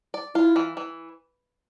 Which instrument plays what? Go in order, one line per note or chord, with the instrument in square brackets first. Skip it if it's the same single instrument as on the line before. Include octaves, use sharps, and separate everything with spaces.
[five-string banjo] D5
[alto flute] E4 [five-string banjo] F4
[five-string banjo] E3
E3